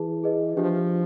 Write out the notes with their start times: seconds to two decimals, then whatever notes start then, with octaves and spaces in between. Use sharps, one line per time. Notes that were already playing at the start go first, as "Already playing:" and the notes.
Already playing: E3 G#4 A5
0.23 G#4 B4 D#5
0.57 F3 D4 G4 C5 E5